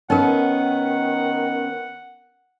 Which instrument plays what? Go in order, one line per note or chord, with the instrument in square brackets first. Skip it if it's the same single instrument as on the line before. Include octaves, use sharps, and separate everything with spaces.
[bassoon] D#3 [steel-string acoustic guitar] B3 C#4 [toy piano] D#4 A#4 [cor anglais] F#5